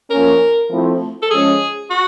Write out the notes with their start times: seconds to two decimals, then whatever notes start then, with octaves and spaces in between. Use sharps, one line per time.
0.10 F3 A#3 C#4 A#4
0.70 F3 A3 C4 E4
1.22 A4
1.31 F3 G#3 C#4 G#4
1.91 F#4